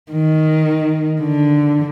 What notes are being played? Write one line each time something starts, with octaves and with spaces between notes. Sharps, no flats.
D#3
D3